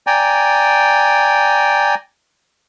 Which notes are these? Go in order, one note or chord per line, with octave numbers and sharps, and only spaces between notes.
D5 G5 G#5 A#5